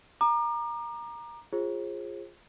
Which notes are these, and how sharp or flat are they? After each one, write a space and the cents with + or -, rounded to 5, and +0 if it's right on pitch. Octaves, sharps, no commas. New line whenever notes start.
A#5 +10 D6 +40
F4 +0 G#4 -15 C5 +40